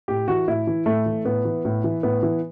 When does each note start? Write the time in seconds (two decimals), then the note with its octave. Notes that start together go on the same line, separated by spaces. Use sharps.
0.08 A2 G4
0.28 E3 F#4
0.48 A2 E4
0.67 E3
0.86 A2 A3
1.06 E3
1.25 A2 B3
1.45 E3
1.65 A2
1.84 E3
2.03 A2 B3
2.23 E3